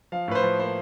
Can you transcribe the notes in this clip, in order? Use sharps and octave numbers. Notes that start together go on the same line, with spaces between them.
F3 F5
A2 B4
C5
F3
A#3 C5